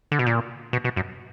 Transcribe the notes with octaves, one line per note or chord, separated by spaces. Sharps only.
D3
B2
A#2
B2
B2
F#2